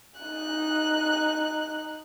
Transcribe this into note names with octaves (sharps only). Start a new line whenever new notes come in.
D#4 F#6